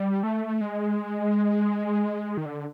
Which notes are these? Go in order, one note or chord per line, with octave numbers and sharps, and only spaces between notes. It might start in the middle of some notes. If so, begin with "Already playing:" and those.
Already playing: G3
A3
G#3
D#3
D3